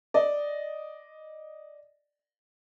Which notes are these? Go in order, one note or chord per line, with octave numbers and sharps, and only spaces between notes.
D5 D#5